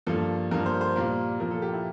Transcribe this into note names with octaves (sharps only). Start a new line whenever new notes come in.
G2 F3 A#3 A4
G2 F3 A#3 A#4
C5
C5
A#2 G3 A#3 A#4
A#2 F3 A#3 A#4
A4
G4
E4